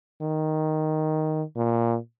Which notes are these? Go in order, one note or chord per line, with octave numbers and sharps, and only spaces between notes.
D#3
A#2